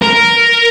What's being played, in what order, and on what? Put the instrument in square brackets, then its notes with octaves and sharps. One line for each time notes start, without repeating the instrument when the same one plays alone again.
[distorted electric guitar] A#4